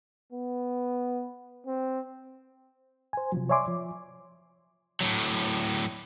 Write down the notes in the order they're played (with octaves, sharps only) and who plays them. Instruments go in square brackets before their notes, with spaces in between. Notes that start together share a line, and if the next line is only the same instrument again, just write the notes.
[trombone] B3
C4
[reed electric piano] C5 G#5
C3 F3 F#3
C#5 D5 E5 G#5 C6 D6
F3
[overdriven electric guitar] A2 F#3